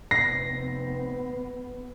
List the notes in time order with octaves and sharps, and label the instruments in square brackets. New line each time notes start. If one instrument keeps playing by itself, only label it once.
[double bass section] F1 C4 [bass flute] B3 [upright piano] A#6 [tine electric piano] C7